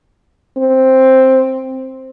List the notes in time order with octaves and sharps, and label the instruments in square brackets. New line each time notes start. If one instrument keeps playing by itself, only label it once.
[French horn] C4